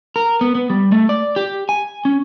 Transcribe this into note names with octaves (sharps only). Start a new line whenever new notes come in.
A#4
B3
B3
G3
A3
D5
G4
G#5
C#4